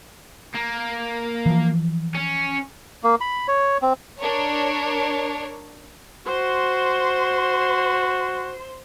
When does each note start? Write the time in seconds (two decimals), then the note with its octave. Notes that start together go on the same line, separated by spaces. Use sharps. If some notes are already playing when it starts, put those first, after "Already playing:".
0.54 A#3
1.46 E3 F3
2.15 C#4
3.03 A#3
3.21 B5
3.48 C#5
3.82 C4
4.19 D4 A#4 C#5
6.26 F#4 C5 C6